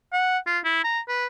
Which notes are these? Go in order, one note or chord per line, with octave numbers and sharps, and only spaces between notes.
F#5
F4
E4
A#5
B4